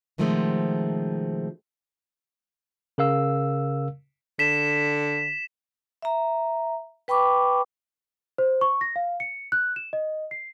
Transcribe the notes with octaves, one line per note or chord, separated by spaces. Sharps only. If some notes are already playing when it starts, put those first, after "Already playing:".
B2 D#3 F3 G#3 A3 C4
C#3 A#4 F5 E6
D3 B6 E7
E5 A#5
B4 G5 B5 C#6 D6
C5
C#6
A#6
F5
C#7
F#6
E7
D#5
C7